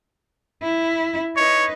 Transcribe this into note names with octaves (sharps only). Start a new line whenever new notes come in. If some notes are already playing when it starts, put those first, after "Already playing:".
E4
D#4 B4 C#5